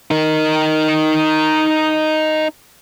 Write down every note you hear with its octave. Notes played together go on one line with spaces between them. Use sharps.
D#4 A#4